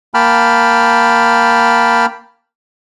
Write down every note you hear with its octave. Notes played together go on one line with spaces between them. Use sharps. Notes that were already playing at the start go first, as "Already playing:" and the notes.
A#3 G5 A5 B5 F6